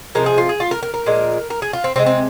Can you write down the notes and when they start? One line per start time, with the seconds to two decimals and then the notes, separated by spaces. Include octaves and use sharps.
0.15 C3 F3 G#3 A#4
0.26 G#4
0.38 F4
0.49 G#4
0.60 F4
0.71 A#4
0.83 A#4
0.94 A#4
1.06 A#2 F3 G#3
1.50 A#4
1.62 G#4
1.73 F4
1.84 C4
1.96 C3 D#3 G#3 C4
2.06 C4